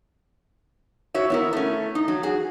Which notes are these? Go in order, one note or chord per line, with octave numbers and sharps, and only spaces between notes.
F#4 C#5 E5
B3 E4 A#4
A3 C#4
D#4
F#3
F#4 G#4